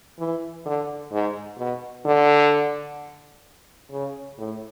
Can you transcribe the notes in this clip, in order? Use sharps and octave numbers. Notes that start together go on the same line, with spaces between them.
E3
D3
G#2
B2
D3
C#3
A2